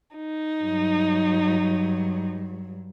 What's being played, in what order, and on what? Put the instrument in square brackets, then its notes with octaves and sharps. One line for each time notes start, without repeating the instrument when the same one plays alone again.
[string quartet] D#4
[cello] G2 F#3